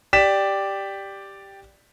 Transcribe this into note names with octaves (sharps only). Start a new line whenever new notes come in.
G4 D5 B6 E7